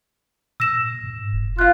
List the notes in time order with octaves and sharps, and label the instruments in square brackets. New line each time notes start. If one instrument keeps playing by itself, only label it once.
[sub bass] A#2 [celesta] E6 A#6 E7
[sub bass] G#2
F1
[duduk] F4 [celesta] F5 F#6